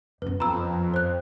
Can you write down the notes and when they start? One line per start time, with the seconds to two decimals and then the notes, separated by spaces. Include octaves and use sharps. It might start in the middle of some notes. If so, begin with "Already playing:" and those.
0.22 F#2 B3 B4
0.40 F2 A#5 B5 E6
0.94 C5 F#6